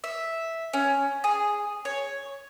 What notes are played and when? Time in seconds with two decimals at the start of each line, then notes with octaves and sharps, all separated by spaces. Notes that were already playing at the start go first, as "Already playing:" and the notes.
0.04 E5
0.73 C#4
1.24 G#4
1.85 C#5